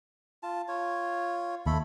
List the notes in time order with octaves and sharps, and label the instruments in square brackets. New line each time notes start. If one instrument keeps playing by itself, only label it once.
[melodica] F4 A5
F4 C#5
[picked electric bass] D#2 [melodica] A3 A4 B5